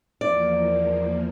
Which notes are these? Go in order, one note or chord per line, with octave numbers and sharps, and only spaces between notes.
E2 F3 A#3 D5